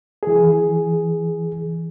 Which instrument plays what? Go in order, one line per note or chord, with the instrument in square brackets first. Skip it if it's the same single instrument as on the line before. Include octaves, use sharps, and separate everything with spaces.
[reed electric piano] E3 G#4